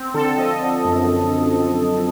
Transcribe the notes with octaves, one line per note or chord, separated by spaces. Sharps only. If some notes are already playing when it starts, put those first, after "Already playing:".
Already playing: C4
D3 A4
F3 D#5
D3
F#2